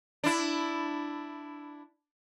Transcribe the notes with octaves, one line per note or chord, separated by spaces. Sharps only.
D4 E4